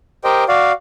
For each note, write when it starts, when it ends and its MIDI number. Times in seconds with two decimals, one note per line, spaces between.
0.24 0.44 67
0.24 0.44 70
0.24 0.44 72
0.24 0.44 75
0.24 0.44 79
0.48 0.72 66
0.48 0.72 74
0.48 0.72 77